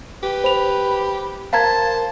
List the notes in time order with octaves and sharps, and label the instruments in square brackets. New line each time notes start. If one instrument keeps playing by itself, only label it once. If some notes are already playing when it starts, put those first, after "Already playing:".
[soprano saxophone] G4 [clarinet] B4
[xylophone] C5 F7 [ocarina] B5
[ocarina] A#4 [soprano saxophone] C5 [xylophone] F5 A#5 G#6 [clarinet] A5